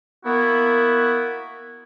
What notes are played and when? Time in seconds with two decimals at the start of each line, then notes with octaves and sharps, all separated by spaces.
0.24 A#3 B3 E4 F#4